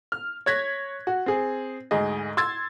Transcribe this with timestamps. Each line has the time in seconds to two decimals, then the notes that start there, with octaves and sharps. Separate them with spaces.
0.12 F6
0.46 C#5 F#6 G#6 A#6 B6
1.07 F#4
1.26 C4 G#4
1.91 D2 G#2 G#4 D#5
2.37 C6 E6 G#6 A6